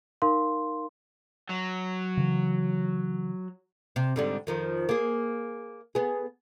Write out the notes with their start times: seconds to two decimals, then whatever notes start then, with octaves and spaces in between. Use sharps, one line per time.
0.22 D#4 A#4 F5 C6
1.50 F#3
2.17 C#3 E3
3.96 C3
4.16 G#2 D3 G3
4.47 F2 D#3 F3
4.89 A#3 G#4
5.95 B3 G#4